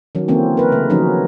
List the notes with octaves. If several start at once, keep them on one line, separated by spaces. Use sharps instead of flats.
D#3 F#3 C#4
D3 E3 A#3 C4 C#4
A#4 B4
C#3 A3
D#3 F3 F#3 C#4 D#4